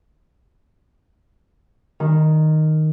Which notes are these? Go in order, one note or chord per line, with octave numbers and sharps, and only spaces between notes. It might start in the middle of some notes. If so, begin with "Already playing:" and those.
D#3